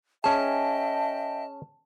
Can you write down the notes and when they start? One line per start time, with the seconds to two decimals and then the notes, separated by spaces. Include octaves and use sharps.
0.24 C#4 G#4 D#5 E5 G5 A5